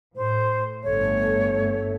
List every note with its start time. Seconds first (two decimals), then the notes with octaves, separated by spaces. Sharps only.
0.16 A2 C5
0.84 G1 A3 C#5